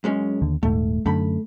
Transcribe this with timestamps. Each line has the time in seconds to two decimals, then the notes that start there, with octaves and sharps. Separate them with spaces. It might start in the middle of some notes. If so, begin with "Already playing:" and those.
0.04 F#2 G#3 C#4
0.42 D#2 D3
0.63 D#1 G#2 A3
1.06 F#2 D3 A3 B5